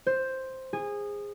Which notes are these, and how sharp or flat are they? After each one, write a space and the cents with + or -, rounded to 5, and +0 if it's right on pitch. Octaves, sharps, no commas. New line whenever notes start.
C5 +5
G#4 -20